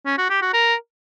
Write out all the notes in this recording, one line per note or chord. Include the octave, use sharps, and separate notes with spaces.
C#4
F#4
G4
F#4
A#4